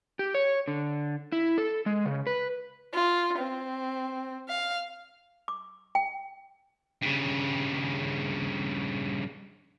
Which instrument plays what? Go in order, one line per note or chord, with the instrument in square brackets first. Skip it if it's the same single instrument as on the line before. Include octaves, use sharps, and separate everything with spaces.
[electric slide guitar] G4
C#5
D3
E4
A4
G#3
C#3
B4
[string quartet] F4
C4
F5
[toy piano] D6
G5
[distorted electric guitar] G2 C#3